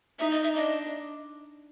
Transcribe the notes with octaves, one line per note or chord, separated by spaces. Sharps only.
D#4 E5
D#5
E5
D4 D#5